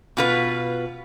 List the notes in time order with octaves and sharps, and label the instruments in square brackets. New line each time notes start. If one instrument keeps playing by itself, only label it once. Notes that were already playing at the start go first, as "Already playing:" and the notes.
[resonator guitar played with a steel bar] B2 F4 B4